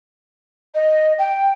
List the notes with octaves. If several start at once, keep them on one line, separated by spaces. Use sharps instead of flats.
D#5
G5